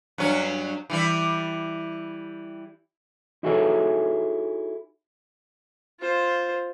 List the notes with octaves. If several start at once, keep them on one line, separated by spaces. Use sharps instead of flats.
G2 F#3 C#4
E3 G3 E4
D#4 E4 F#4 G#4 A4 C#5
F4 C5